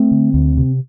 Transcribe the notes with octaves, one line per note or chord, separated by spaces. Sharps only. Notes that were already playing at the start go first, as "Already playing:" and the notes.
Already playing: A3 C4
D3
D2
C3